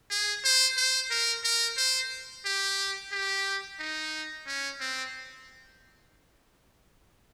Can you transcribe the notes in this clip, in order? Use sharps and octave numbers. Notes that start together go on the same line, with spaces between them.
G#4
C5
C5
A#4
A#4
C5
G4
G4
D#4
C#4
C4